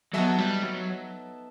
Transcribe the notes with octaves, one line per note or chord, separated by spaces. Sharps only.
F#3 B3 D#4 A4 E5
G3
F#3